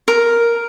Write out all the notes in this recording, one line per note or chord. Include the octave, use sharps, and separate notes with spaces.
A#4